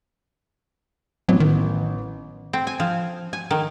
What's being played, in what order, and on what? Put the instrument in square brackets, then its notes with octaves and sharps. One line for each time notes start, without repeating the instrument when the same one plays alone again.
[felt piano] A1 B3 [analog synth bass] F#3
[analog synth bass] D#3
[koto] C4
G#5
F3
G#5
D#3